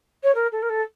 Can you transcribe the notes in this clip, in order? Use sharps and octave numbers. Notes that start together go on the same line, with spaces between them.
C#5
A#4
A4
A#4
A4